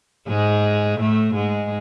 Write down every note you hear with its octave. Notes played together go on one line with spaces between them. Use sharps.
G#2 G#3
A2 A3
G#2 G#3